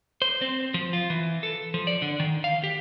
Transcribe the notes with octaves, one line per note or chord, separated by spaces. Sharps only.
C5
C4
F3
F4
E3
A4
F3
D5
D3
D#3
F5
G4